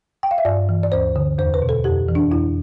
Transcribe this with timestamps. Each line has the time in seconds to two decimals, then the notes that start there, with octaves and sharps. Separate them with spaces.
0.23 G5
0.31 F5
0.38 E5
0.45 G2 D5
0.69 E3
0.83 D5
0.92 D2 C5
1.16 D3
1.38 E2 C5
1.54 B4
1.62 B2
1.69 A4
1.84 F2 G4
2.09 E3
2.15 D4
2.31 F2 E4